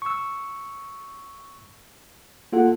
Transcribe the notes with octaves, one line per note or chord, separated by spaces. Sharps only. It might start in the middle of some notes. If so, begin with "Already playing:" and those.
C#6 E6
A#3 F4 A4 F#5